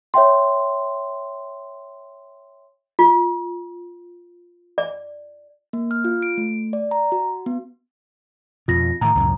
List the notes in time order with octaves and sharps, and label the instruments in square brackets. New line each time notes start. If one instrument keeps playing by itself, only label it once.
[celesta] C#5 E5 G5 C6
[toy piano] F4
D5
[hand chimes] A#3
F6
F4
D7
A3
D5
A#5
F#4
B3
[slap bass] F2 B2 [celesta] F4 A#6
[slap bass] A2 D#3 [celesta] A#5
[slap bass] C#2 F#2 A2